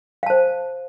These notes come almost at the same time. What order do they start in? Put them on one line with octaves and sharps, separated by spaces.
F5 A5 C5